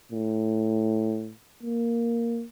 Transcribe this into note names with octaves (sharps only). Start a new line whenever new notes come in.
A2
A#3